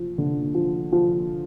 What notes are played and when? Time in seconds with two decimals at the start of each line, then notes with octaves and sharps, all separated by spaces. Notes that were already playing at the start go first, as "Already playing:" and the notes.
Already playing: F3
0.18 D3
0.55 F3
0.92 F3